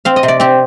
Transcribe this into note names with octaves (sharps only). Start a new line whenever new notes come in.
C4 F5
D#5
C3
D5
C4 G4